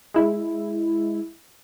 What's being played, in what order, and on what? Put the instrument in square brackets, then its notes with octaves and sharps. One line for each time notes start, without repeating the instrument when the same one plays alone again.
[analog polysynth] G#3 E4